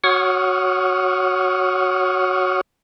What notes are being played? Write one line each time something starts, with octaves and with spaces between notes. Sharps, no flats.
F#4 C#5 F#5 C#6 D#6 F6